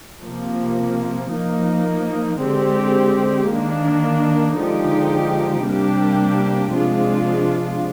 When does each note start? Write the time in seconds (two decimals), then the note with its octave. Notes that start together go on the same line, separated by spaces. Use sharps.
0.25 C3 F3 A#3
1.33 F3 A#3 D#4
2.41 D3 G#3 C4 G4
3.49 D#3 A#3 D4
4.57 D3 F3 G#3 D#4 G4
5.64 C3 G3 A#3 D4 G4
6.73 C3 F3 G#3 D4 F4